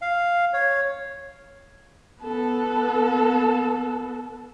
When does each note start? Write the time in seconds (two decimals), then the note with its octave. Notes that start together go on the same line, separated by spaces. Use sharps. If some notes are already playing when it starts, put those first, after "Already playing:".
0.02 F5
0.53 C#5
2.22 B3 A4